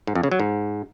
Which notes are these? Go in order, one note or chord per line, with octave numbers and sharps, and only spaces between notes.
G#2
F2
C#3
F#3
G#2